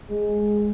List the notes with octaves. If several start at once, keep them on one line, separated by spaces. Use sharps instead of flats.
G#3